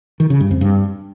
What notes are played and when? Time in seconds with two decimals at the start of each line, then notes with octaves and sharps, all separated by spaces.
0.20 D#3
0.30 C#3
0.40 G2
0.51 F2
0.61 G2